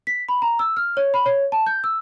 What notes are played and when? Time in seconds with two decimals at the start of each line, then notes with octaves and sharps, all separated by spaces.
0.07 B6
0.29 B5
0.42 A#5
0.59 E6
0.77 F6
0.97 C#5
1.14 B5
1.26 C#5
1.52 A5
1.66 G6
1.84 E6